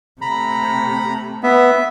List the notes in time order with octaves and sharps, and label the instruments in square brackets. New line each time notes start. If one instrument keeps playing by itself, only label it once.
[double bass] C3 A3 [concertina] A#5 B5
[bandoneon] B3 [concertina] E5